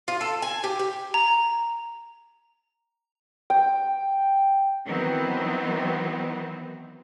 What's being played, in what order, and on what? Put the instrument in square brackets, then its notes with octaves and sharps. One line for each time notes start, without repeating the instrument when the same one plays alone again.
[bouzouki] F4
A4
G#5
G4
G4
[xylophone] A#5
[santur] G5
[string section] D#3 E3 F#3 B3 C4